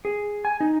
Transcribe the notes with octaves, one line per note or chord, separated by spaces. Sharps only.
G#4
G#5
D#4